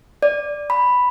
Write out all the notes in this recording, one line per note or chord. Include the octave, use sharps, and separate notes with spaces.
D5
B5